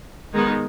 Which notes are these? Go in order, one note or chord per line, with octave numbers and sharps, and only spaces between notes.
D#3 G#3 B3 D#4